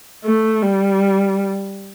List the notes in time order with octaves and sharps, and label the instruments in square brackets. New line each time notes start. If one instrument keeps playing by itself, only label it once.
[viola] A3
G3